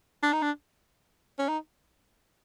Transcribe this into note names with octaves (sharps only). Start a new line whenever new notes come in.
D4
D#4
D4
C#4
D#4